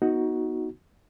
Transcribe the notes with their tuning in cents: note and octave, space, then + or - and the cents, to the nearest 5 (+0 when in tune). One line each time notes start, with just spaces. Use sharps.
B3 -20 D#4 +20 F#4 +0